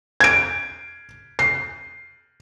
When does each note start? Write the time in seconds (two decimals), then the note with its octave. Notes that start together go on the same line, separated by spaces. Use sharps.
0.20 G#6 D7
1.39 C7